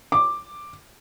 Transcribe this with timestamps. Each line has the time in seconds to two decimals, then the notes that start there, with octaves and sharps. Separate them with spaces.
0.12 D6